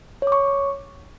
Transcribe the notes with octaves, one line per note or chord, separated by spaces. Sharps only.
C#5 C#6 D6